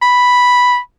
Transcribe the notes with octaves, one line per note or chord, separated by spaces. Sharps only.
B5